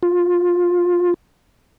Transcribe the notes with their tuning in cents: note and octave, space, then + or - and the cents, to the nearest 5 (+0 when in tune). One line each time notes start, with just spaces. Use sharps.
F4 +15